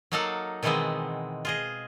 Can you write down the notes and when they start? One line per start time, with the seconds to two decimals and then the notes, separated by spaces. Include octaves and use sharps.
0.12 F#3 A#3 D#4 A4 F5 F#5
0.63 B2 D#3 E3 G#3 B3 C4
1.45 F4 G#4 D#5